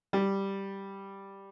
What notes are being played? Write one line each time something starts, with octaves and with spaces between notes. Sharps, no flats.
G3